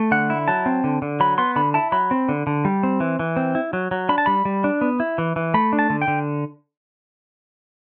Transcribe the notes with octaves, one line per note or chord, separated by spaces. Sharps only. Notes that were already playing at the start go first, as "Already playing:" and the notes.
Already playing: A3
D3 F#5
E4
F#3 A5
C4
D3
D3
F#3 B5
B3 C6
D3 B5
E4 A5
F#3 B5
C4
D3
D3
G3
C4
E3
E3
C4
E4
F#3
F#3
D4 B5
A5
G3 B5
G3
D4
B3
E4
E3
E3
A3 B5
D4
A5
D3
G5
D3